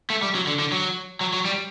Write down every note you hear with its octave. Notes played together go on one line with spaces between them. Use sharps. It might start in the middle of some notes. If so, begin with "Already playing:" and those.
A3
G3
F#3
D3
D3
F#3
F#3
F#3
G3